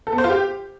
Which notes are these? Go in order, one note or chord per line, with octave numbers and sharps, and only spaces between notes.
A4
B3
C5
F4
G4